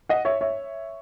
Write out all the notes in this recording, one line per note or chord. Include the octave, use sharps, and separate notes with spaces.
D#5 F#5
C#5 E5
C#5 E5